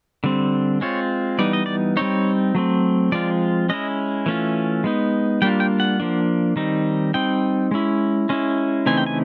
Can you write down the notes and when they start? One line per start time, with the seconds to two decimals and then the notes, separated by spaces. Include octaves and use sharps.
0.24 D3 G3 C4
0.81 G#3 C4 F4 C#5
1.39 E3 G3 B3 D#4 D5
1.53 D#5
1.66 D5
1.97 G3 C4 D#4 C#5
2.55 F#3 A3 C4
3.12 F3 G#3 C4 F4 D5
3.69 G#3 C#4 E4 D#5
4.26 E3 A3 C#4 F4
4.84 G#3 B3 D#4
5.42 G3 A#3 D4 F4 G5
5.60 G5
5.80 F#5
6.00 F3 A#3 D4
6.56 D#3 G3 C4 D#4
7.14 G3 C4 D#4 G5
7.71 G#3 C#4 E4
8.29 G#3 C#4 E4
8.86 C#3 E3 A3 C4 D#4 G#5
8.97 G5
9.06 G#5